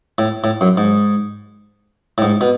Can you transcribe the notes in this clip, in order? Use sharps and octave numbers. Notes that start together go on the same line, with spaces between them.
A2
A2
F#2
G#2
A2
G#2
B2